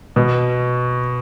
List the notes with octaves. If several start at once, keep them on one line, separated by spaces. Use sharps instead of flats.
B2